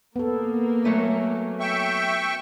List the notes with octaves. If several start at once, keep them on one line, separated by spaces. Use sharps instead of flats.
A#3 B3 A4
F#3 A3 C#4
E5 G5 C#6